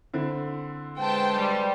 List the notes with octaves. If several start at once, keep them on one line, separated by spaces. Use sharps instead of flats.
D3 C4 E4
G#3 B4 C5 G5 A5
G3